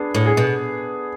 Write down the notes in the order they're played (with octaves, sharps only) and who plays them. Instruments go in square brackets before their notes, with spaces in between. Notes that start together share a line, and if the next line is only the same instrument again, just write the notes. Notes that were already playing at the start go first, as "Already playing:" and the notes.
Already playing: [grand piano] B3 D4 G#4
[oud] A2
[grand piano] G#4
[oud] B2